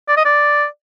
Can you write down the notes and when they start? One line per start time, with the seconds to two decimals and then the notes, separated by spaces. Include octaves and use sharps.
0.08 D5
0.17 D#5
0.25 D5